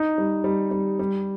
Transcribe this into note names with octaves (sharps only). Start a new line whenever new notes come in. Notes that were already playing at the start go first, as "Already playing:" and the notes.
Already playing: D#4
G3
G3
G3
G3